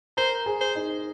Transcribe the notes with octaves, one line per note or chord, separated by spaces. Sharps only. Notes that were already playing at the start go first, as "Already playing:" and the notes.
A#4 C5 A#5
G#4 G#5
C5
D#4 D#5